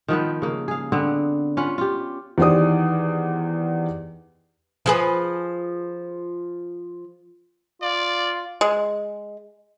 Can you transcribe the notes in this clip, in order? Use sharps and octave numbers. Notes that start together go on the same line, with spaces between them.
D#3 F3 B3 B4
C#3 A#3
G#4 F5
D3 B3 C4
C#4 F4 B4 F#5
F4 G4
E2 D#3 G4 C5 D5 D#6
F3 G#4 B4
F4 D5
G#3